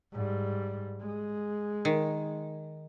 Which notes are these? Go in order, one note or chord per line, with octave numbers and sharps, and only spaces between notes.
G#2 G3
G#3
D#3